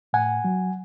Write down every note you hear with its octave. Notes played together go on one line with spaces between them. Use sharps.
A2 F#5 G#5
F#3